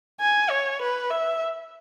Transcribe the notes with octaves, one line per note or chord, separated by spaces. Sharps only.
G#5
C#5
B4
E5